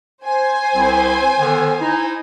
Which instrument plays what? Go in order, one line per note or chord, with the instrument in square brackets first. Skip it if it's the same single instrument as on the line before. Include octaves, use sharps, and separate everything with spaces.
[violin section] C5 G#5
[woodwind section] C2 C4 E4
D3 D#3 B3
D#4 E4